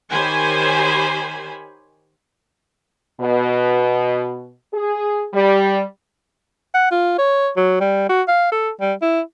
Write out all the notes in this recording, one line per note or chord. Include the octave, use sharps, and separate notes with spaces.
D#3 G4 C5 C#5 G#5 B5
B2
G#4
G3
F#5
F4
C#5
F#3
G3
F#4
F5
A4
G3
E4